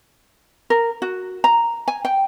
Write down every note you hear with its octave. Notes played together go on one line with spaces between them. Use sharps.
A#4
F#4
A#5
G#5
G5